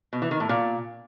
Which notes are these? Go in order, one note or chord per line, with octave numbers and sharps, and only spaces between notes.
B2
E3
D#3
A2
A#2